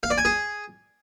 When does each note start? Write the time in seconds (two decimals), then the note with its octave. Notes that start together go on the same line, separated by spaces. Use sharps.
0.03 F5
0.10 D5
0.18 G#5
0.25 G#4